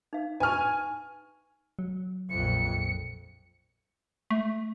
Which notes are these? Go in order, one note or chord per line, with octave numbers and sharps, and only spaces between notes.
D#4 F5
B4 G#5 A5 C#6 F6
F#3
A#1 F2 C#7
A3